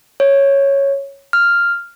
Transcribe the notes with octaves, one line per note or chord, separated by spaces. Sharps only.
C#5
F6